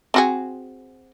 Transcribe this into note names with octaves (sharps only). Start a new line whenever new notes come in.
C4 F#4 G#4